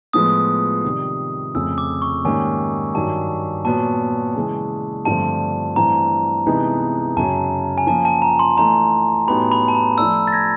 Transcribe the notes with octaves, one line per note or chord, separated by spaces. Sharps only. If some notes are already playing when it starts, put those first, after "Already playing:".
A2 F3 G#3 B3 D#6
C3 D#3 G3
F2 C#3 F3 A3 E6
D6
C#6
G#2 D#3 G3 A#3 C#4 G#5
G2 D#3 F#3 A5
A#2 F#3 B3 A5
C#3 E3 G#3
G2 D3 F3 A3 C4 A5
G2 E3 A3 C4 A#5
C3 E3 G#3 B3 D#4
F#2 C#3 F#3 A5
G#5
F3 A#3 C#4 F4 A5
A5
A#5
C6
E3 A3 D4 A#5
A2 F#3 B3 D#4 G4 B5
B5
A5
A#5
F3 A3 D4 E6
A6
G#6 A#6